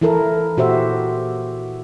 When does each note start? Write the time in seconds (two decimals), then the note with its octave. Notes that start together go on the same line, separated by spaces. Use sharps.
0.01 E3 E4 A4 A#4
0.57 A#2 F#4 G4 C5 E5